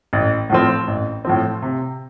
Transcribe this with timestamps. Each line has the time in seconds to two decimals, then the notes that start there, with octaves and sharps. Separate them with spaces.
0.13 A1
0.50 A2 F3 C4
0.87 A1
1.25 A2 F3 C4
1.62 C3